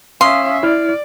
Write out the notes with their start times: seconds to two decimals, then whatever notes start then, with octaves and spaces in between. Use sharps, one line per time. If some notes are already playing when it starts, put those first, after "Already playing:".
0.21 C#4 E5 F5 C6 D#6
0.63 E4 D5 F6